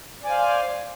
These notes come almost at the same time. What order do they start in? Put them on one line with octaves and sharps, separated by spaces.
D5 G#5 C5 F5